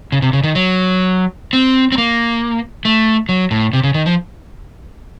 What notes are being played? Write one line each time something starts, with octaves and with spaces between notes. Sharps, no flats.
C#3
C3
C#3
D#3
F#3
C4
C4
A#3
A3
F#3
A2
C3
C#3
D#3
F3